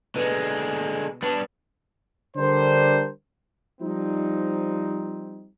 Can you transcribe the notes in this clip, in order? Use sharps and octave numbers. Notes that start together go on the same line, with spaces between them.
B2 D3 G#3
G3 B3 D4 C#5
D3 G3 D4 A#4 C5
F3 G3 C4 D#4